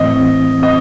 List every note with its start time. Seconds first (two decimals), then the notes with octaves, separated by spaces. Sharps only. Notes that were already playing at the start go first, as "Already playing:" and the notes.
Already playing: A2 E3 C4 D#5
0.62 C4 D#5